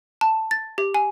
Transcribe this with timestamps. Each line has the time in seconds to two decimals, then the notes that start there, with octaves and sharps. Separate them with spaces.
0.21 A5
0.51 A6
0.78 G4
0.94 G#5